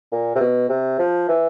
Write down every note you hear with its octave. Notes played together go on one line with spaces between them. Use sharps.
A#2
C3
B2
C3
F3
E3